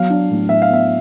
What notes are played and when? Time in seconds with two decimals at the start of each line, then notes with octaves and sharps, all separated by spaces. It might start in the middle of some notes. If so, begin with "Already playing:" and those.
Already playing: F#3 B3 F5
0.10 D4
0.30 A2
0.49 A2 E5
0.62 F5
0.69 B3 E5